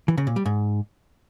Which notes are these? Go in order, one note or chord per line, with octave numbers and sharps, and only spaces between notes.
E3
C#3
A#2
G3
G#2